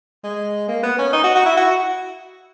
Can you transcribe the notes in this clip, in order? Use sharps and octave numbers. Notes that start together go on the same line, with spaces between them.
G#3
A#3
B3
C#4
D#4
F#4
F#4
E4
F#4